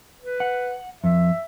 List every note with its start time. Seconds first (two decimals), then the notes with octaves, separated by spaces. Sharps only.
0.21 B4
0.40 F#5
1.04 F2 E5